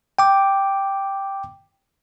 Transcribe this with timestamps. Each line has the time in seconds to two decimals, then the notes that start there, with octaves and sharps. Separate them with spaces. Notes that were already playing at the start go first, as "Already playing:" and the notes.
0.19 G5 D6